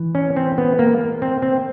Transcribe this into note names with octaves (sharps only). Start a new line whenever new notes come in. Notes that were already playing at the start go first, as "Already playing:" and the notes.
Already playing: E3
C#4
C4
B3
A#3
C4
C4